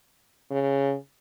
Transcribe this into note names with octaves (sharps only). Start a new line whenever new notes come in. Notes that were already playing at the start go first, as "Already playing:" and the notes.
C#3